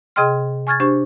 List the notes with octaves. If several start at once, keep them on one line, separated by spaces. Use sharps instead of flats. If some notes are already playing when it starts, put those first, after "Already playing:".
C3 G#4 D#5 G5 C6 F6
G#5 C#6 F6 G#6 A6
D4 G4 C5 C#6